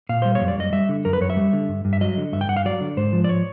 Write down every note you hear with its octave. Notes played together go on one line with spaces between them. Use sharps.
A#2 F5
G3 C5
C#5
F#2
D5
F#2 D#5
G3 E5
D3
F#2 A#4
B4
F#2 C#5
E5
G3
D3
G2
G2
E5
F#3 D#5
D3
G2 E5
G5
G2 F#5
F5
F#3 D5
D3
G#2 C5
F3
D5
C#5